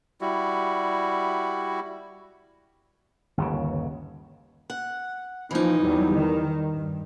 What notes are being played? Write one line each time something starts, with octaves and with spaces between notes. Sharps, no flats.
G3 E4 F#4
G1 D#2 C#3
F#5
E3 F3 D#4
E2 F#3 G3
D#3
G2